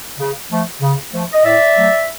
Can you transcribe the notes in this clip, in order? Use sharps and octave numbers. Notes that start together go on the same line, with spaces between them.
C#3
F3 A3
C#3
F3 A3
D#5
A2 D5 E5
F#3 A3